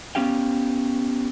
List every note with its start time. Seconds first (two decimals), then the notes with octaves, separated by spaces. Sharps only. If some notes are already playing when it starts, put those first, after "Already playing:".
0.15 B3 C#4 G4 F5 G5